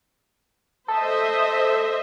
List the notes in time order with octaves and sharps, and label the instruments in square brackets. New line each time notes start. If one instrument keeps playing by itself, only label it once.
[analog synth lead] A4 [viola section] C5 D#5 E5